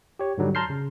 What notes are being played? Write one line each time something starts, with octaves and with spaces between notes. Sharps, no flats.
G4 C#5
G#2 D3 F#3 G3
A5 A#5 C6 F6 G6 C7
C#3